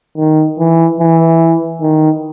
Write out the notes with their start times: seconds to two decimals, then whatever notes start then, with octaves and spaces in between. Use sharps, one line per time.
0.18 D#3
0.59 E3
1.00 E3
1.81 D#3